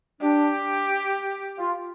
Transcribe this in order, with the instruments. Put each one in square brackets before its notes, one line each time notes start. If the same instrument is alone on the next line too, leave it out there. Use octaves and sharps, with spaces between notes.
[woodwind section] D4 [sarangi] G4
[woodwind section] F4